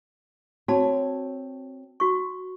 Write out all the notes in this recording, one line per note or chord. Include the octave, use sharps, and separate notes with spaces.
C4 F#4 C#5 A5
F#4 C#6